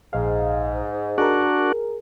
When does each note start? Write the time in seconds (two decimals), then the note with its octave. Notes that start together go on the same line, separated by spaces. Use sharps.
0.13 A#1 G#2 F5
1.18 D4 F#4 G#4 A#4